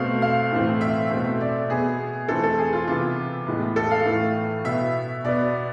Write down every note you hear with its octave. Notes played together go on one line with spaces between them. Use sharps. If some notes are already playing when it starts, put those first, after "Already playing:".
Already playing: B2 A3 C4 F5
F5
A2 E3 A3 C4
E5
B2 A3 C4
D5
B2 B3 G#4
E3 A3 C4 A4
A4
G#4
F4
C3 E3 B3 F4
A2 E3 G#3 B3
A4
F5
A2 E3 A3
B2 B3 E5
B2 B3 D5